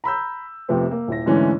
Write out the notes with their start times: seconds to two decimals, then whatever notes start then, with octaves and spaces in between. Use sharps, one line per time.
0.04 A#5 B5 E6 G6
0.68 F2 C3 F3 A3 B3 C4
0.91 A#3
1.08 D#1 E4 A#6
1.26 D2 G#2 D3 E3 C#4